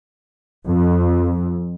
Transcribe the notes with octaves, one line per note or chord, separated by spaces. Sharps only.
F2